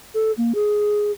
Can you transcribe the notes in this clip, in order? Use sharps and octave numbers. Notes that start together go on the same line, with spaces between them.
A4
A#3
G#4